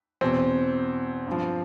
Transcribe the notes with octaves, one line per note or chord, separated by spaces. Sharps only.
E2 B2 C4
G2 F3